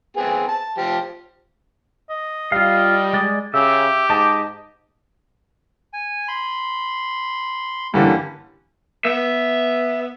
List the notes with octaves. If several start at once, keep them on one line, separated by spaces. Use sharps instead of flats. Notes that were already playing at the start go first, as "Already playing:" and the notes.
B3 C4 G#4
A5
F3 G4
D#5
G3 F4 F5
G#3 D5
C#3 G4 E5
G#2 D#5 A5 D6
G#5
B5 C6
G2 D3 E3 A#3 C#4 G4
B3 E5